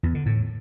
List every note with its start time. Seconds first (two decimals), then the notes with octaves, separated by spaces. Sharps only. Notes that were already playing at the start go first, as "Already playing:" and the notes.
0.03 E2
0.15 D3
0.26 A2